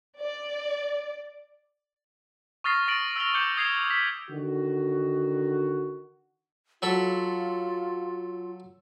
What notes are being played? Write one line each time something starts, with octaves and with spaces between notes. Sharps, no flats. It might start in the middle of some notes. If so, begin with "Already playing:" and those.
D5
C#6 D#6 F6 A6 A#6 C7
C#6 A6 A#6 D7 F#7
E6 F6 A#6 F7 G7
D6 E6 G6 C#7
D#6 G#6 C7 F7 G7
B6
D3 D#3 F#4
F#3 F4 A4 B5